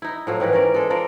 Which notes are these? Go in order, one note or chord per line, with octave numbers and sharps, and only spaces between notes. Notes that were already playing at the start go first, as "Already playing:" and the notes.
D#4 E4
A2 F3 F#3
G#2 D#3 E3 B4
C#4 A#4 D5
G#3 A4
F3 A4 A#4 D5